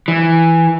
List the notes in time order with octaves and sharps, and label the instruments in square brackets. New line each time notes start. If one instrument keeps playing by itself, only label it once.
[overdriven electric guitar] E3